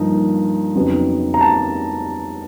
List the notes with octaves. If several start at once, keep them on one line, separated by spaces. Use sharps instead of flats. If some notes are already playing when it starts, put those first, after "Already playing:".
Already playing: G2 D3 F3 A#3 D#4
F2 C#3 F#3 B3 D#4
A#5
A5